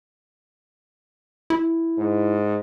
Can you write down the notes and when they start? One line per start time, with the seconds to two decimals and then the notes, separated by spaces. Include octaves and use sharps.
1.50 E4
1.98 G#2